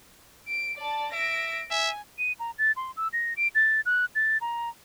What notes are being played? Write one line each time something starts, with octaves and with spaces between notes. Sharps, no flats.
D7
D5 A5
E5 A#6 D7
E5 G#5
D#7
A#5
A6
C6
E6
A#6
D7
A6
F#6
A6
A#5